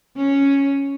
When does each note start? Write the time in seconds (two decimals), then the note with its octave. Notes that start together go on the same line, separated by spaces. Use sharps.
0.16 C#4